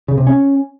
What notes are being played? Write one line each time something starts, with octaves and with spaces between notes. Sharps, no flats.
C#3
C3
C#4